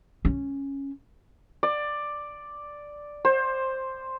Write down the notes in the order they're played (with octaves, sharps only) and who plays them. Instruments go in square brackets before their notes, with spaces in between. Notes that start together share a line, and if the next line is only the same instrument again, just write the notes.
[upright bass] C#4
[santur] D5
C5